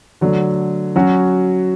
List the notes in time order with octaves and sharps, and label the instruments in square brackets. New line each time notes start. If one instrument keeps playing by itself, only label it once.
[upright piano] D3 F#3 A3
F#3 C#4 F#4